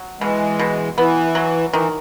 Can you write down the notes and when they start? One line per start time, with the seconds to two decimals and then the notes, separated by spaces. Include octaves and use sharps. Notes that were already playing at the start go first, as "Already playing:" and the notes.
Already playing: F#3
0.21 B2 E3 G#3
0.59 B2
0.98 E3 B3
1.35 F#3
1.73 D#3 E3